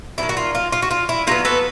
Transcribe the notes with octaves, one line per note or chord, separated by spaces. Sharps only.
D#3 F#3 B3 D4 E4
F#4
F4
F4
F4
F#4
F4
E4
D3 F#3 B3 F4
A4 B4